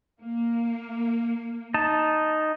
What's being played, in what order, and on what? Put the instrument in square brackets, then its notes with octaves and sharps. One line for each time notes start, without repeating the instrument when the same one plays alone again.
[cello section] A#3
[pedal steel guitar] D#4 A5